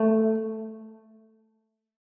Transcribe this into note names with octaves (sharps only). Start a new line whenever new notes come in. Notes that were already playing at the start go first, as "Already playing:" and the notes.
Already playing: A3